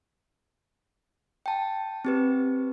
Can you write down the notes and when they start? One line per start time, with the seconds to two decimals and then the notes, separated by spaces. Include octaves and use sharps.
1.46 G5 A5
2.05 C4 G4 B4